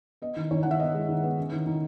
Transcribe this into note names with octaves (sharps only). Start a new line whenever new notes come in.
B3 D#5
D#3
D#3 C#5
D#3 F#5
E5
B3 D#5
G#3
D#3
B3
C#4
D#3
D#3